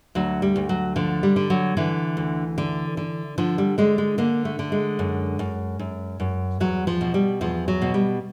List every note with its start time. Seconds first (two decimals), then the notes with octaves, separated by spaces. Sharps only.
0.15 D2 F#3
0.42 G3
0.56 D2
0.69 F#3
0.96 D3 F3
1.23 G3
1.36 D3
1.50 F#3
1.77 D3 E3
2.17 D2
2.58 D3
2.97 D3
3.38 D3 F3
3.58 G3
3.78 D3 G#3
3.98 G#3
4.18 D3 A#3
4.45 A3
4.59 D3
4.72 G#3
4.99 F#2
5.39 F#2
5.79 F#2
6.20 F#2
6.60 E2 F#3
6.87 F3
7.01 B2
7.14 G3
7.41 E2 F3
7.68 F#3
7.82 B2
7.94 G3